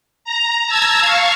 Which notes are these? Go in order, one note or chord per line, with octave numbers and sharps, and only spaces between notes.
A#5
A5 A#5 E6 G#6
F5 C#6